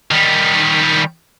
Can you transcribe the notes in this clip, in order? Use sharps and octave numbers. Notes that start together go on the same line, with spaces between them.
D#3 G3